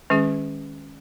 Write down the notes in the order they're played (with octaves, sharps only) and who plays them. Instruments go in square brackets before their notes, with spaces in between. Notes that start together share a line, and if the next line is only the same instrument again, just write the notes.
[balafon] D#3 G#3 C#4 G#4